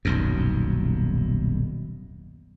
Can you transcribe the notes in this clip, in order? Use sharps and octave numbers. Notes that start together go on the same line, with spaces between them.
D#1 B1 F#2